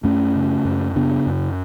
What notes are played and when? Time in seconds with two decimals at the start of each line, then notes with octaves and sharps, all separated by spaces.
0.04 F#2 A3 C#4
0.35 C#3
0.65 F#2
0.96 C#3 B3 D4
1.27 F#2